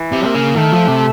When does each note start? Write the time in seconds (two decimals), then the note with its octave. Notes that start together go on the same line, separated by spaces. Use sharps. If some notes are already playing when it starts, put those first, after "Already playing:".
Already playing: E3
0.12 C3
0.23 A#3
0.35 C#3
0.56 D#3 A3
0.73 F3
0.88 C3